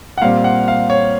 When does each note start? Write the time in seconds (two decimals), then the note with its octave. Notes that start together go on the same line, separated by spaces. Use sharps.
0.18 F#5
0.21 A#2 G3 C4 F5
0.44 F#5
0.68 F5
0.90 C#5